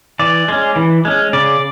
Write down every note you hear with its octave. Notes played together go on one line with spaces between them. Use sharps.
E3 D5
G#3 C#4
E3
G#3 C#4
C#3 D5